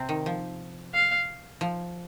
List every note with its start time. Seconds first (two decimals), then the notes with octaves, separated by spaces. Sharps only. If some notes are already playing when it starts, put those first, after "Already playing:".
Already playing: C3 C4
0.09 D#3
0.26 F3
0.94 F5
1.61 F3